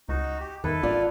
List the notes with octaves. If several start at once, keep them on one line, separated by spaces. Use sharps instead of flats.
C#2 D#4 F#4
G4
E2 D#3 E4 A4 B4
A1 F4 D5